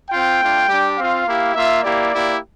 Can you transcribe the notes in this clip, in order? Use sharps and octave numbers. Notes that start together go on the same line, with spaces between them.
C4 F4 G5
A3 D4 F4
G3 D4 G4
C4 F4 F5
A#3 E4 G4
A#3 F4 E5
A#3 E4 G4 D5
A#3 E4 G4